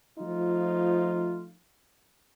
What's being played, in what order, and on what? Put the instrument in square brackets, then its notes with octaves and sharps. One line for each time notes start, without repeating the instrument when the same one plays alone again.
[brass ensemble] F3 A3 D#4 F4